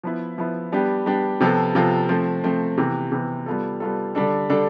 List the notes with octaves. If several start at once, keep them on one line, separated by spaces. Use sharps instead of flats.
F3 B3 E4
F3 B3 E4
G3 B3 D4 G4
G3 B3 D4 G4
C3 F3 B3 F4 A4
C3 F3 B3 F4 A4
F3 A3 C4
F3 A3 C4
C3 E3 B3
C3 E3 B3
G3 B3 F4 A4
G3 B3 F4 A4
D3 G3 D4 A4
D3 G3 D4 A4